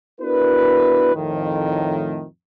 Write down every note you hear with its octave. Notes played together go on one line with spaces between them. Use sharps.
B3 D4 E4 F#4 A#4 B4
F2 A2 D#3